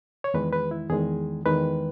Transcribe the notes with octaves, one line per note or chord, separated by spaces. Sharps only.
C#5
E2 D#3 G#3 B4
B4
E4
E2 D#3 G#3 G#4
E2 D#3 G#3 B4